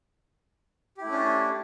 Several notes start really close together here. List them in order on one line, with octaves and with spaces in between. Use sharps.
G4 E4 A3 C#4 D4